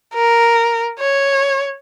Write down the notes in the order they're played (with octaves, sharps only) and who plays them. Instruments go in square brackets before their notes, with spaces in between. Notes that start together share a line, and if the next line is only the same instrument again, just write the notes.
[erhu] A#4
C#5